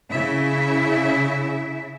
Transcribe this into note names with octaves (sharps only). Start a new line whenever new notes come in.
C#3 E4 E5